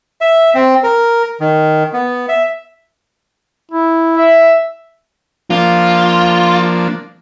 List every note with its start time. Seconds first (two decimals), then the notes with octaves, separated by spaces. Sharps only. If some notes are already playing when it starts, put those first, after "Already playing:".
0.21 E5
0.55 C4
0.83 A#4
1.40 D#3
1.93 B3
2.29 E5
3.71 E4
4.17 E5
5.50 F3 A#3 D4 F4